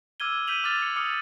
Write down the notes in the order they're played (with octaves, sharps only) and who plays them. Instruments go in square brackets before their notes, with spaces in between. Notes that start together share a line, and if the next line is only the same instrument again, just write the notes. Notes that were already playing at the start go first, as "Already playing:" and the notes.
[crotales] D6 E6 F6 G#6 D#7 G7
G6 B6 D#7 F7 F#7
D6 F6 A6 F7
C#7
D6 D#6 F6 C#7